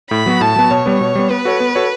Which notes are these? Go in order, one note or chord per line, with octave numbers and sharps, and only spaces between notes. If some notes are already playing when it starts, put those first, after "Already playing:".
A2 B5
F#3 B3 F#4
A2 A5
F#3 B3 F#4
B2 C#5
G3 B3
B2
G3 B3
B3 B4
F#4 A4 C#5
B3
F#4 A4 C#5